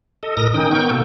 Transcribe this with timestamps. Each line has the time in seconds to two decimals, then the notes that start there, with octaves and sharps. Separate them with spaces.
0.23 A4 D#5
0.37 A2 A#4 D#6 A#6
0.54 D#3 C#4 D#4 G5 D#6
0.71 B3 A#4 G5 C#6 G6
0.91 B2 A#3 A4